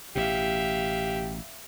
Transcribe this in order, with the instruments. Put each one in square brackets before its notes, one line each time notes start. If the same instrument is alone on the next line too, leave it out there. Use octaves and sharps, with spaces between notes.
[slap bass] A1 B2 [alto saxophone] G4 [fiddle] E5 F5